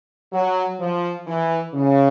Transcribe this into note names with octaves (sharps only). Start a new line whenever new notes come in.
F#3
F3
E3
C#3